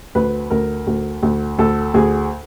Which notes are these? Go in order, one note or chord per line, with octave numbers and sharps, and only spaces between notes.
D2 B4
D2 A#4
D2
D2
D2 A4
D2 G#4